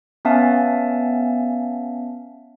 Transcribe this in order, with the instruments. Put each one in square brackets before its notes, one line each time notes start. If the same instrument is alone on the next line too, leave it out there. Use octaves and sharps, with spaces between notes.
[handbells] B3 C#4 E5 F5 G#5 A5